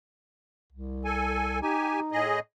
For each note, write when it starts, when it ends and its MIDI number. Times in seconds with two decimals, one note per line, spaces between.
0.73 1.61 36
1.05 1.59 69
1.05 1.59 80
1.62 2.22 63
1.62 2.00 67
1.62 2.00 80
2.12 2.39 45
2.12 2.39 68
2.12 2.39 75